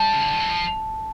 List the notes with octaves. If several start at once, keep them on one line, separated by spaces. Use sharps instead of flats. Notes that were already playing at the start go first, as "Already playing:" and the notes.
Already playing: G3 A5
C#3
D3
D#3
E3
F3